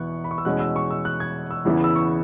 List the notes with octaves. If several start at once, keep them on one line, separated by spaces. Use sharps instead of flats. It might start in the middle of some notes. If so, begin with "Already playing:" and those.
Already playing: E2 B2 B3 E4 C#6 F#6
B5
C#6
E6
E2 B2 G#3 C#4 F#6
E6
C#6
E6
F#6
G#6
E6
E2 C#3 E3 B3 E4
E6
C#6